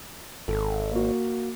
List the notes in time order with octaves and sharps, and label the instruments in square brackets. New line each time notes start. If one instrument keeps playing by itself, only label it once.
[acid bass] G#1 [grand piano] A4
[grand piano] A#3 F#4